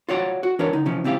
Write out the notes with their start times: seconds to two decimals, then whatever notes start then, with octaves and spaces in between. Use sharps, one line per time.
0.09 F4 F#4 C#5 D5 F#5
0.43 F#4
0.59 E3 D4 A#4 B4 C#5
0.73 D3 D#4
0.86 C3 E3 F3 C#4
1.04 C#2 C4 E4 G4 F5